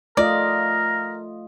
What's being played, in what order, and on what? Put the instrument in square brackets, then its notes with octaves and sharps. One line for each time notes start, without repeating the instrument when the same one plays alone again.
[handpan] A3 F4 D#5 [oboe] A#4 [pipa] D5